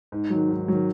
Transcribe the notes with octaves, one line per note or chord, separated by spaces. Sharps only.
G#2
D#3 F#3
G#2
D#3 F#3